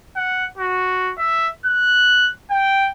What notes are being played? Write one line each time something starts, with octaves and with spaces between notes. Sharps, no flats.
F#5
F#4
E5
F#6
G5